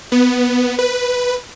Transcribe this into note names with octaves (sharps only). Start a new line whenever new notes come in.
B3
B4